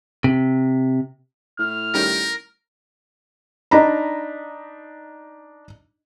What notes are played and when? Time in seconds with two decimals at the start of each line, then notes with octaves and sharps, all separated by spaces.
0.24 C3
1.59 A2 F6
1.94 D#3 G3 C#4 A#4
3.71 D4 D#4 D#5 A#5 B5